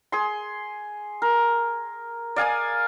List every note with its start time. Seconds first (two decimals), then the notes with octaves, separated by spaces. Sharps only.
0.12 G#4 C6
1.22 A#4
2.36 D5 F5 G#5 D#6